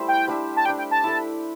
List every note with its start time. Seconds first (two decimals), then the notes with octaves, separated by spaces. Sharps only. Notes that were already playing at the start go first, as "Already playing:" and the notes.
Already playing: G3 A3 E4 C5 E5
0.08 G5
0.28 G3 D4 G4 E5
0.57 A5
0.65 D4 G4 D5 G5
0.78 G5
0.91 A5
1.04 E4 A4 E5